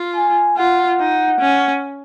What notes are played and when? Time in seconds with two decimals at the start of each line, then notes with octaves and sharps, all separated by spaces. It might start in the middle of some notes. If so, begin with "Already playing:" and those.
Already playing: F4
0.16 G#5
0.57 F4 F#5
0.99 D#4
1.41 C#4